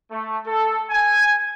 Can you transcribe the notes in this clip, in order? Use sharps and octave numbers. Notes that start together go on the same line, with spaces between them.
A3
A4
G#5